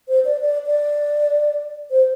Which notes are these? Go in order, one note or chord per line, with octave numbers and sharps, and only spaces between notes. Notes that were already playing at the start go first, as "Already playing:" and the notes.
C5
D5
D5
D5
C5